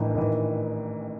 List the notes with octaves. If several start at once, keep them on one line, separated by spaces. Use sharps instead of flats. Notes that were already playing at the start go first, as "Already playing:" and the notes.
Already playing: A1 A2 D#3 E3 D4 D#4
A1 A2 D#3 E3 D#4